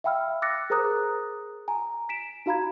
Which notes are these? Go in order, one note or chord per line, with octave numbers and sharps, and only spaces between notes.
E5 F5 G5 B5 E6 F6
D6 E6 F#6 A6 A#6 C#7
G#4 A#4 C5 A#5 D#6 F#6
G#5 A#5
B6 D7 E7
D#4 F#4 F5 A#5 B5 G#6